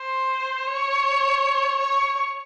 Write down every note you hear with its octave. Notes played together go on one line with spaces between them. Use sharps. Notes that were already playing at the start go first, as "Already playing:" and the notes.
Already playing: C5
C#5
C#5